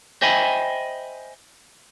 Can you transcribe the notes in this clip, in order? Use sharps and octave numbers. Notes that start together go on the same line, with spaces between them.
C5 D#5 E5 G5 G#5 B5